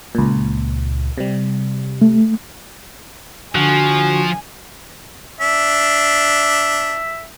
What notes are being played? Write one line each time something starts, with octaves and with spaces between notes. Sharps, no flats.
C#2 A#2
C3 G3
A3
D3 F3 F#4 G#5
D4 E5